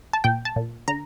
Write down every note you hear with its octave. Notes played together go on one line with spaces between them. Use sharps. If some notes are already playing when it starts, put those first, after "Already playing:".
A5
A#2 G5
A5
A#2
D3 A#5